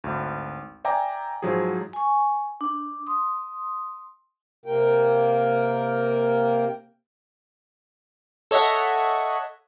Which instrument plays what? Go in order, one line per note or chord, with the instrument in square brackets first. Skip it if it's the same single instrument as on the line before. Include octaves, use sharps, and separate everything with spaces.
[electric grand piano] G#1 D2
D5 E5 G5 G#5 A#5 D6
G#2 F3 F#3 G4 G#4
[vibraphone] G#5 C#6
D4
C6 D#6
[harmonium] C3 A#3 A#4 G5
[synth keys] A4 C#5 D#5 E5 F#5